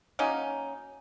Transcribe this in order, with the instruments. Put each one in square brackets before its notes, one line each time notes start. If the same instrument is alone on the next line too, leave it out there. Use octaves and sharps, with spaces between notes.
[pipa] F#3 A#3 C#4 D#4